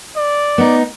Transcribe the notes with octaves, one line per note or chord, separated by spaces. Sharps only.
D5
B3 D#4